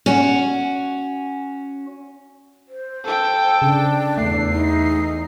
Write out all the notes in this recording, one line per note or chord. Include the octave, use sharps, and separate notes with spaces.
C#4 F#4
C5
A4 G5
C#3 D4
E2 A3 C7
D#4